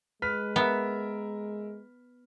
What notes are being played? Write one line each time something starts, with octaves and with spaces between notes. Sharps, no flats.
G#3 B4 F6 B6
B3 A#4 E5